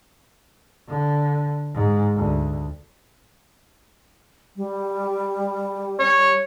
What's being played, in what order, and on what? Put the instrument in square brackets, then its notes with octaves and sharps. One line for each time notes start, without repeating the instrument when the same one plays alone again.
[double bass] D3
G#2
D2
[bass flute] G3
[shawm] C#5